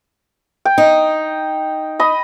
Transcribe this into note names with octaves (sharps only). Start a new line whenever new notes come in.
G5
D#4
D#5 B5